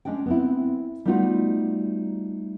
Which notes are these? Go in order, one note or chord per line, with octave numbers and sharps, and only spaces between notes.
G#3 C#4 D4 D#5 G5
B3 C4 E4
G3 A3 B3 D#4 F4 F#4